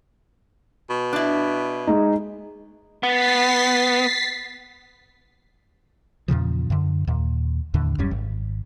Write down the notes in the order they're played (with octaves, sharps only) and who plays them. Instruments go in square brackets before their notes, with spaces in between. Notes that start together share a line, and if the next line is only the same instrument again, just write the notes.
[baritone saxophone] B2
[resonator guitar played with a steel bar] D4 E4
[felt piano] G#3 D#4
[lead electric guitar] B3 [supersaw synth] A6 B6 C7
[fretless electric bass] E2 A#2 C#3 F3
F#2 D3
D#2 A#2
D#2 A2 D3
D1 F#2 G3 C#4
G#1